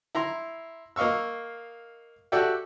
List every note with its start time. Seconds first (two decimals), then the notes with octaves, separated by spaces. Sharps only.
0.15 E4 A#5 C6
0.96 A#3 D#5 F5 C#6 E6
2.32 F#4 G4 A4 D5 E5 G5